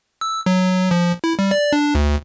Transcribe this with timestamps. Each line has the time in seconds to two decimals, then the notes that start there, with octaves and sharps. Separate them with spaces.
0.21 E6
0.46 F#3
0.91 F3
1.24 E4
1.39 G3
1.51 D5
1.73 D4
1.95 D2